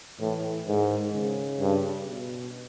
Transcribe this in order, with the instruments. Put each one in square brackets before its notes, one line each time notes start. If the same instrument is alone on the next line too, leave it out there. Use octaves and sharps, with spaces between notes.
[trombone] A2 [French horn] E3
[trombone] G#2 [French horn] D#3
[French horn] C#3
[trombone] G2
[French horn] B2